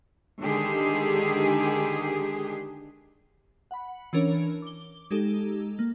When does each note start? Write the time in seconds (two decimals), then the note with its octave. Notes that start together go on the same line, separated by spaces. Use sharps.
0.41 D3 D#3 G#3 G4 G#4
3.71 F#5 B5
4.13 E3 C#4 D4 A#4 C#5
4.62 D6 G7
5.11 G#3 D#4 G4 A4
5.79 A#3